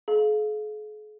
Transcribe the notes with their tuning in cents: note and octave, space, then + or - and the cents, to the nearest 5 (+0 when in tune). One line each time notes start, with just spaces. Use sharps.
G#4 +45 F5 +0